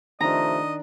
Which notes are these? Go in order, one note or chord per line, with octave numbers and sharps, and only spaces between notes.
C3 D#3 F3 A3 D4 D#5 A#5